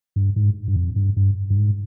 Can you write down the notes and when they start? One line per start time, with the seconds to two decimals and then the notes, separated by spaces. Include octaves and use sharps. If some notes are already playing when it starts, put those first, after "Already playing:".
0.16 G2
0.36 G#2
0.68 G2
0.76 F2
0.96 G2
1.17 G2
1.50 G2
1.57 G#2